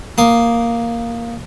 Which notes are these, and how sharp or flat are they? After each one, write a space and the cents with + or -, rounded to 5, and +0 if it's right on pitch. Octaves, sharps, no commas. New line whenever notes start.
A#3 +0 D#6 -5